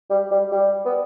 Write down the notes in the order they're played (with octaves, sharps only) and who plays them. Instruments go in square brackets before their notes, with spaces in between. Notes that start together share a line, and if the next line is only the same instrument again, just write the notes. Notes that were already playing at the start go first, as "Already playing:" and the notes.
[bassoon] G3
G3
G3
B3